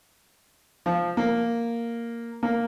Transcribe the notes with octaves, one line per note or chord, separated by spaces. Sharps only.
F3
A#3
A#3